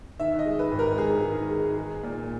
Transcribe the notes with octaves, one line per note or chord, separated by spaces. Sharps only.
D#3 E5
D#5
G#3
B4
G#1
A#4
G#1 G#4
D#3
G#3
G#3
A#2